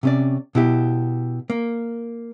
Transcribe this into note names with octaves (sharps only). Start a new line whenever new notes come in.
C3 C#4 D5
B2 E4 G4
A#3